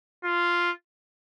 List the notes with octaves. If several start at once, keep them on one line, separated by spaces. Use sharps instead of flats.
F4